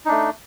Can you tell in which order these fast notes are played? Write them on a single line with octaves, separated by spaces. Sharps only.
D#4 D4 A3